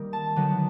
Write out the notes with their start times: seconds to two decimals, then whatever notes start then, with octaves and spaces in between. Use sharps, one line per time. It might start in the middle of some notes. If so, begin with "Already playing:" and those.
Already playing: D#3 G3 A#3
0.13 A5
0.36 D3 F#3 B3 D#4